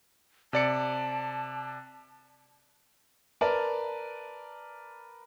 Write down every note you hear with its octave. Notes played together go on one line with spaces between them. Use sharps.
C3 D5 A5 C#7
A#4 B4 D5 A5